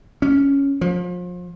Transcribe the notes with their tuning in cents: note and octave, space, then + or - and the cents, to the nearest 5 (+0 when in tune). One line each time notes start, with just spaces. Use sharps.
C#4 +5
F3 +35